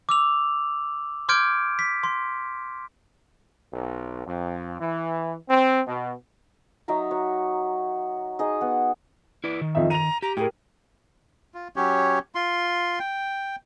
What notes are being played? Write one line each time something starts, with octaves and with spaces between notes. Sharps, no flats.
D6 E6 F7
C6 D6 F6 G6 G#6 D7
B6
C6
B1
F2
E3
C4
B2
F#3 D#4 E5 A#5
F#4 C#5
D#4 G#4 D#5
B3 F#5
E4 B4 D5
D#3
F2 D#4 E5
A#5 D#7 F7
G4 A#5
A2 G4 G#4 A#4
F4
F#3 C#4 G4 C#5
F4 C6
G5